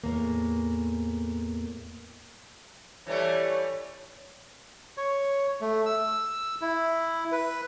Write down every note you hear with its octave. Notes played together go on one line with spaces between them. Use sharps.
E2 A2 A#3
E3 G3 A3 C#5
C#5
A3
E6
E4
B4